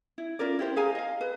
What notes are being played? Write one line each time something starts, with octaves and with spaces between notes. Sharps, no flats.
E4
C#4 F4 A#4 D5
E4 G4 C5
G#4 F5 G#5 A#5
D#5 F5
B4